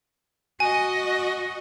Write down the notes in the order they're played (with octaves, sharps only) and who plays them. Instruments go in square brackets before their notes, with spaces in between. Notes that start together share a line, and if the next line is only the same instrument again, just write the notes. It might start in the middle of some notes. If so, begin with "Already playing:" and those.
[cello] F#4 D#5 [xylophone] G#5